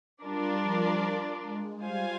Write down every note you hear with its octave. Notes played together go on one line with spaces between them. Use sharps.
G3 D4 F4 A#4 D5
F3
G#3
G3 F4 C5 F5 G#5